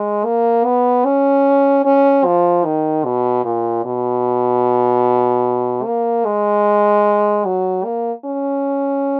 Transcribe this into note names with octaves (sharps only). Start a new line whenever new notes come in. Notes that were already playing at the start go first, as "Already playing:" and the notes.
Already playing: G#3
A#3
B3
C#4
C#4
F3
D#3
B2
A#2
B2
A#3
G#3
F#3
A#3
C#4